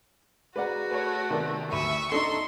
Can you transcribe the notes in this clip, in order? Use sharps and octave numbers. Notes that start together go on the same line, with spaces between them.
G#3 F#4 B4 D5 F#5 A#5
A3 B4 C#5
C3 D#3 B3 A#4 D5
D2 E5 B5 C#6 D#7
D4 D#4 A4 D#5 A#5 C6